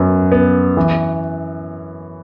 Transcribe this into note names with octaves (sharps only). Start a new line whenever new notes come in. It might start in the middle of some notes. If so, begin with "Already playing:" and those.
Already playing: F#2 B3
B3
E3